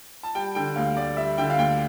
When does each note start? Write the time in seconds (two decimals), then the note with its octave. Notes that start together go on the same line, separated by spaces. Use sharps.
0.23 A5
0.35 G3 G5
0.55 D3 G5
0.76 D2 F5
0.97 D2 D5
1.17 G3 E5
1.38 D3 G5
1.50 F5
1.58 D2 G5